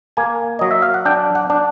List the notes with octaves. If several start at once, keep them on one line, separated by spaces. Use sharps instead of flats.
A#3 G#5
F#3 D#5
E5
F5
F#5
D4 G5
F#5
D4